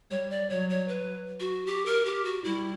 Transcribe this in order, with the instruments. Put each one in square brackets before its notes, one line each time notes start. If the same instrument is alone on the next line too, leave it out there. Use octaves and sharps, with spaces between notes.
[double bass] G3 [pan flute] C#5
[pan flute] D5
[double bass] F#3 [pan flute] C#5
[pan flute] C#5
B4
F#4
G4
A#4
G4
F#4
[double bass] G3 [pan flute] E4